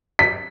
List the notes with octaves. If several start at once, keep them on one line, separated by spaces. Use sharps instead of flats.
B6